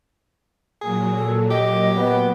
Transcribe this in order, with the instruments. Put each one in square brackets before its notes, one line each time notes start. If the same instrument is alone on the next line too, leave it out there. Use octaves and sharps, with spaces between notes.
[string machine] A#2 F#3 [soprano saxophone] G#4
[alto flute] A4
[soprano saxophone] G4 [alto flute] D#5
[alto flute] B3